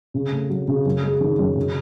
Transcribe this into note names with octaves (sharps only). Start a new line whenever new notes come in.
C#3
A3
F#3
C#3
F#2
G#3
D#3
F#2
C#3